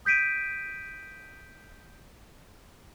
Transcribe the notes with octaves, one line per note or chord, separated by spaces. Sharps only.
D#6 G6 B6 D7 D#7